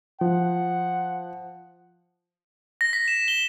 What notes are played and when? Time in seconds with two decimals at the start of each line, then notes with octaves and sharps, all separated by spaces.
0.21 F3 F#5
2.81 A#6
2.93 B6
3.08 E7
3.28 G7